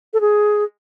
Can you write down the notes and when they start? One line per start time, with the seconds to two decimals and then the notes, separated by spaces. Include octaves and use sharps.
0.13 A4
0.21 G#4